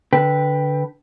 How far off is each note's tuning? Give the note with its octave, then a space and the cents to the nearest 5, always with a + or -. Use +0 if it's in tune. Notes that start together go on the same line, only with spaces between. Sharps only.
D3 -10 B4 +0 G5 +0